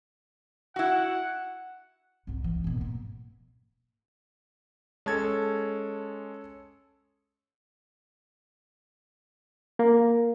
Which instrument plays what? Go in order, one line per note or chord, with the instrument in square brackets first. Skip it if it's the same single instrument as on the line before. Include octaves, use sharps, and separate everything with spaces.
[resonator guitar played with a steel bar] E4 F#4 [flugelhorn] F#5
[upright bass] C2 G#2
E3
G#1 B2
A#3
[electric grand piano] G#3 A5 G#6 [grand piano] C#4 A4
[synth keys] A#3